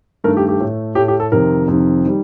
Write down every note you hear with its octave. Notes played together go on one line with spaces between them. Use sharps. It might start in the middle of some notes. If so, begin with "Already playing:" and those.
G2 D#3 A3 A#4
G4
G4
A2 A3
A2 A3 G4
G4
A4
F2 C3 D#3 A#4
F2 C3 D#3
D#3 G3